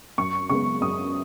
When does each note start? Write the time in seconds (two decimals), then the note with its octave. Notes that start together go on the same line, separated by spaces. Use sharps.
0.18 F#2 C#6
0.49 C#3 G#3 B3 C#6
0.81 F#2 D#6